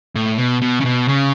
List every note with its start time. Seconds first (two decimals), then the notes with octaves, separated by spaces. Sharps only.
0.15 A2
0.38 B2
0.62 B2
0.80 C#3
0.85 B2
1.08 C#3